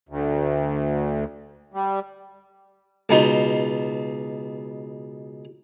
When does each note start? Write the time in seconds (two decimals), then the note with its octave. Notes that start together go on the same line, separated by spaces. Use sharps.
0.09 D2
1.74 G3
3.09 C#2 B2 D#4 C6